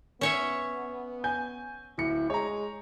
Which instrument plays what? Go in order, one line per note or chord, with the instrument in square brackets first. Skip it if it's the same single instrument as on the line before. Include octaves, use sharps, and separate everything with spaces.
[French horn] B3 [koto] C#4 C#5 E5
[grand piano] G#5 G6
[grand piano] D1 C#7 [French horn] E4
[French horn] G#3 [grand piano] C#5 A#5